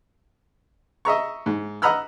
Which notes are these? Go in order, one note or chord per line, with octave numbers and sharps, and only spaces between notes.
D#5 E5 A#5 C#6
G#2
D#5 F#5 A#5 B5 E6 F6